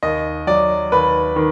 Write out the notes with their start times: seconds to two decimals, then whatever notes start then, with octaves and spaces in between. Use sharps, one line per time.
0.03 D#2 D#5
0.47 F#3 D5
0.92 D#2 B4
1.36 D#3